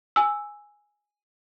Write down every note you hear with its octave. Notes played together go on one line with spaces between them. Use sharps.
G#5 E6